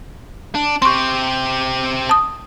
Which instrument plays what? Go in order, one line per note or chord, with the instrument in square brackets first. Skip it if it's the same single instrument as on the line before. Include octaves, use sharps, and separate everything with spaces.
[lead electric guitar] D4
[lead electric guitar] C4 G4 [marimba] C6 C#6
[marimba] A5 D#6